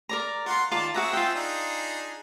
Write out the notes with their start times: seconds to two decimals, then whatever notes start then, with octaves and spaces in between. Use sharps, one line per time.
0.09 A#4 D5 A#5
0.46 F4 A#4 F#5 C6
0.72 D#3 F4 A#4 D5 A5
0.94 C4 F#4 G#4 E5 F#5 A#5
1.13 F4 G5
1.35 D4 D#4 G#4